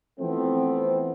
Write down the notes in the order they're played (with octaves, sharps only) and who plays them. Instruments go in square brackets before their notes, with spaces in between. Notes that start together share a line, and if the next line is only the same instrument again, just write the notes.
[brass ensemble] E3 F3 A3 B3 C4